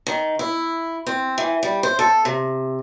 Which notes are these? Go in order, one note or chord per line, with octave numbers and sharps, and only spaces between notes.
D#3
E4
C4
E3
G3
C5
A4
C3